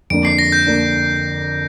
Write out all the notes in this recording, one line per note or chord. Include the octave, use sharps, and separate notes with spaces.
F2 D3 A#3 D4 D7
C7
A#6
G6
D3 A#3 D4